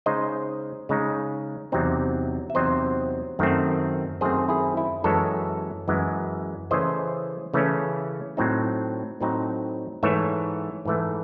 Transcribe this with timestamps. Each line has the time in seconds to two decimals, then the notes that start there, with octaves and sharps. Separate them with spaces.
0.06 C#3 G#3 D#4 C5 D#5
0.89 C#3 G#3 D#4
1.72 E2 C3 F#3 C4 D#4
2.50 E5
2.55 E2 C3 F#3 C4 D#4 C5 D#5
3.39 F#2 D#3 A3 C4
4.21 F#2 D#3 A3 C4 G#4 C5
4.49 E4 G#4
4.77 E4
5.04 F#2 E3 G#3 A4 C#5
5.88 F#2 E3 G#3
6.71 C#3 E3 A3 C#4 C5 D#5
7.54 C#3 E3 A3 C#4
8.37 A2 F#3 C4 D#4
9.21 A2 F#3 C4 D#4
10.03 G#2 E3 A3 C#5 E5
10.85 G#2 E3 A3